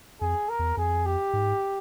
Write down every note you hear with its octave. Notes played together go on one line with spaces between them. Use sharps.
F2 G#4
A#4
E2
F2 G#4
G4
G#2